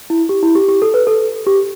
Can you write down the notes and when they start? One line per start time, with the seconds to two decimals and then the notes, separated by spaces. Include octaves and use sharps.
0.10 E4
0.29 G4
0.43 E4
0.55 G4
0.69 G4
0.82 A4
0.94 B4
1.07 A4
1.47 G4